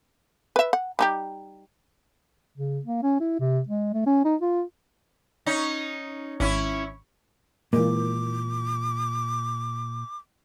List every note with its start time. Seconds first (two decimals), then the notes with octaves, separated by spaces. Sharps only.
0.56 B4 E5
0.73 F#5
0.99 G3 D#4 G4
2.58 C#3
2.85 A#3
3.03 C#4
3.20 E4
3.40 C3
3.69 G#3
3.94 A3
4.06 C#4
4.25 D#4
4.42 F4
5.46 C#4 D#4
6.40 G#1 C#4 E4
7.73 A#2 E3 G#3 A#3 D6